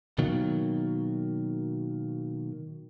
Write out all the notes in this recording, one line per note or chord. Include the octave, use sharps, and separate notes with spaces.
B2 D#3 F#3 A#3